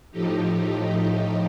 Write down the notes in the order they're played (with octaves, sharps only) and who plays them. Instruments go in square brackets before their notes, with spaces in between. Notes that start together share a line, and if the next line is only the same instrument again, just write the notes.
[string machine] A2 F3 A3 D#4 G4